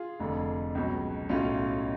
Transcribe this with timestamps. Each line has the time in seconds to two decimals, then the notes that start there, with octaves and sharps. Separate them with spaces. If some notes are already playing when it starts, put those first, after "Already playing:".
Already playing: F4 G#4
0.20 F1 F2 D3
0.75 C#2 B2 F#3
1.29 B1 A2 F#3 C#4 F4